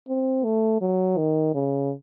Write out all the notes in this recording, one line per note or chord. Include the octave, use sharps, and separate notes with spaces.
C4
A3
F#3
D#3
C#3